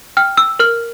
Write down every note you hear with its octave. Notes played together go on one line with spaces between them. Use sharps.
G5 F6
E6
A#4 F6